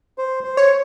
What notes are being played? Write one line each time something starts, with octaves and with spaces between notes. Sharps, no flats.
C5
C5
C#5